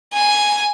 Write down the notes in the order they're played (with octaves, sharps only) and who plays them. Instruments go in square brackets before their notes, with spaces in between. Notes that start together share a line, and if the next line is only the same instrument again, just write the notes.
[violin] G#5